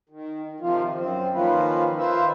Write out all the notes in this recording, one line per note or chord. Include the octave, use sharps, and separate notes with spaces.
D#3
C3 D#3 F3 F4
F#2 C4
D#3 F3 A#3 C#4 F4 B4
D#3 F4 B4 C5 E5